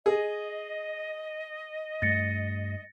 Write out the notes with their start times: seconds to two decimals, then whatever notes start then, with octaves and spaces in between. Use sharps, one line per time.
0.06 G#4 D#5
2.02 G2 A3 A6 A#6 C#7